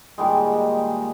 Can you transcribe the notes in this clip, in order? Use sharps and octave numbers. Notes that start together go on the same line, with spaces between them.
A#2 D#3 G3 G#3